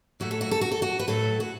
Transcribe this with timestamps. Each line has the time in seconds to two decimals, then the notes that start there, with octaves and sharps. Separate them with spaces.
0.20 A2 F#3 A3 F#4
0.31 A4
0.41 F#4
0.51 A4
0.61 F#4
0.72 A4
0.82 F#4
0.99 B4
1.08 A2 F#3 A3 A4
1.40 F#4